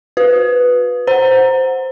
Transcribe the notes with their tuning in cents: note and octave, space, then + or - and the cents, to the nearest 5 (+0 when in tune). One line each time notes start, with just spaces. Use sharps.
F#4 -30 B4 +0
C5 +0 F#5 -10 A#5 +0